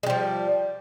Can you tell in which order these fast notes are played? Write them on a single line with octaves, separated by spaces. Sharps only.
G#3 G3 F3